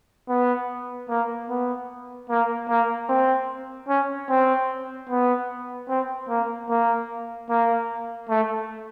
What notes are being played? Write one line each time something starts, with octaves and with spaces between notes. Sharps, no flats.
B3
A#3
B3
A#3
A#3
C4
C#4
C4
B3
C4
A#3
A#3
A#3
A3